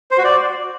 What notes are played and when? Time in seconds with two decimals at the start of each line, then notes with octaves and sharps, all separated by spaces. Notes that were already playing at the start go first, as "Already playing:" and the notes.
0.11 C5
0.18 F#4
0.24 D5